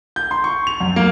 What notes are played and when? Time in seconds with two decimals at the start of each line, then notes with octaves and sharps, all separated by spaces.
0.16 G6
0.31 C6
0.44 C#6
0.67 F7
0.80 F#2
0.96 A#3